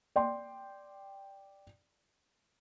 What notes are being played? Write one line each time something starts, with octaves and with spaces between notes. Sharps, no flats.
D5 G5 C6